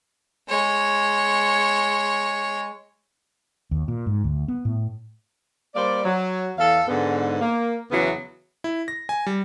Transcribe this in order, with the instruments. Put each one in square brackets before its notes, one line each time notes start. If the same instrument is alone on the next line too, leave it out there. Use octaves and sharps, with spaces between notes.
[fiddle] G#3 C#5
[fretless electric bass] D#2
A#2
G#2
D2
B3
A2
[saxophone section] G3 A#3 C5 D5
F#3
E2 A4 F5
G#2 D3 B3
A#3
E2 C#3 E3 F#3 B3 E4
[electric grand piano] E4
A#6
G#5
G3